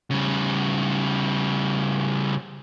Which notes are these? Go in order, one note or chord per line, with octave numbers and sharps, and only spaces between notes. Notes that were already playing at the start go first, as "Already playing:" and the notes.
C#3 G3